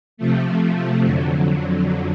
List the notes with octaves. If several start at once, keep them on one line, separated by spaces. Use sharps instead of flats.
C3 F3 A3
F2 D3 F#3